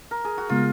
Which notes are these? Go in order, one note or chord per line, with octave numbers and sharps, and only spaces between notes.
A#4
G#4
F#4
C#3 G#3 B3 F4